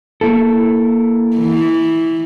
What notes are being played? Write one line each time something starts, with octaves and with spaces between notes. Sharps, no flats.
A#3 E4 A4
E3